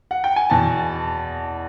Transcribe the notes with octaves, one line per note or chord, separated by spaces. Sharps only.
F#5
G5
G#5
E2 B2 A5